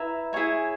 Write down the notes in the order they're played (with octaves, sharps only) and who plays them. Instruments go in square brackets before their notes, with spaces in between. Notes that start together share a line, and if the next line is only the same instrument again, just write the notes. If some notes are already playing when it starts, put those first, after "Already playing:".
Already playing: [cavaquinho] E4 B4 E5 A#5
E4 G#4 C#5 G#5